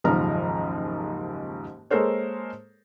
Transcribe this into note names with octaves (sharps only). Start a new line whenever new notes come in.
F#1 D#2 G#2 F3 A#5 F6
G#3 A#3 A4 A#4 C5 C#5